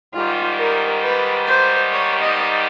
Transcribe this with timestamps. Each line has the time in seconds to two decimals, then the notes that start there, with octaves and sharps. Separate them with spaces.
0.13 G#2 D#3 G3 F4
0.58 A#4
1.03 B4
1.47 C5
1.92 C#5
2.22 D#5